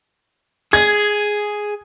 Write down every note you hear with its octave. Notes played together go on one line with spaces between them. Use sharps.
G#4 G#6